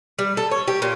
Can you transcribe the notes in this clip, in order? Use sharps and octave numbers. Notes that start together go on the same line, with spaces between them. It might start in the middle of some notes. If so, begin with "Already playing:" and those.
G3
A4
C#5
G4
A#2